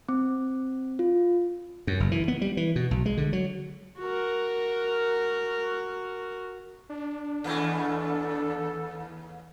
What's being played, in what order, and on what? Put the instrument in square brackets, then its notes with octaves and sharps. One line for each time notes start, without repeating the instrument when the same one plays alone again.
[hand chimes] C4
F4
[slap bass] F#2
F#1
E3
B3
G3
E3
B2
B1
G#3
D3
F#3
[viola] F#4 A#4
[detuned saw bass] D4
[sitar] D#2 E3 A3 [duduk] A4